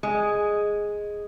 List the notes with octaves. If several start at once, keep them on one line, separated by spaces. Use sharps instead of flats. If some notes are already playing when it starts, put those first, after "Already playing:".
G#3